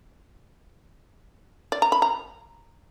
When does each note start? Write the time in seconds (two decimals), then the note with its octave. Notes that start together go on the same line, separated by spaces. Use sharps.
1.72 D5
1.82 A#5
1.92 B5
2.02 A#5